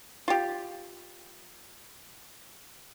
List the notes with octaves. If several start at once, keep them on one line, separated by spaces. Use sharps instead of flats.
F4 G4